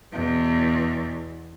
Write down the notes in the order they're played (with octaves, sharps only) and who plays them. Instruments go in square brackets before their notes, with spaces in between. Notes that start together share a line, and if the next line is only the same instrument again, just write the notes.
[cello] E2 B2